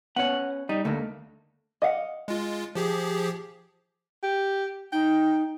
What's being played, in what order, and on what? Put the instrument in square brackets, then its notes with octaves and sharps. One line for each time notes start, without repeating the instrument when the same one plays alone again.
[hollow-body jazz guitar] B3 C#4 C#5 [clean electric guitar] F#5
[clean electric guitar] G3 [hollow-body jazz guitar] D#4
[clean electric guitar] D2 [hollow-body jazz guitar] A3 A#3 D4
[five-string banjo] D#5 F5 F#5
[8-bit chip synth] G#3 F4
F3 G4 G#4
[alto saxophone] G4
[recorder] D#4 [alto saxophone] G5